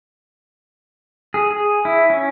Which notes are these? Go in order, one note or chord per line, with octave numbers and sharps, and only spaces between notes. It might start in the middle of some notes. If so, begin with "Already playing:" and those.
G#4
G#4
E4
C#4